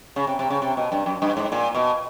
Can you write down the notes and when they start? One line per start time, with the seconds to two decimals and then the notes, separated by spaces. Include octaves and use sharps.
0.16 C#3
0.27 C3
0.39 C3
0.50 C#3
0.62 C3
0.77 B2
0.92 G2
1.06 F#2
1.22 G2
1.37 G#2
1.52 A#2
1.75 B2